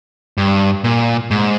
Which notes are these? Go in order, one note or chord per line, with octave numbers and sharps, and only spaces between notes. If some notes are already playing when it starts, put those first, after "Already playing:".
G2
A#2
G#2